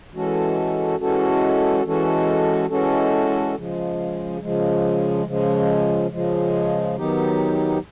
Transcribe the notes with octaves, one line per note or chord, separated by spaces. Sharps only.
E3 G#3 C#4 F#4 A4
E3 G#3 C#4 F#4 A4
E3 G#3 C#4 F#4 A4
E3 G#3 C#4 F#4 A4
C#3 F3 G#3
C#3 F3 G#3
C#3 F3 G#3
C#3 F3 G#3
D#3 F#3 B3 D#4 G4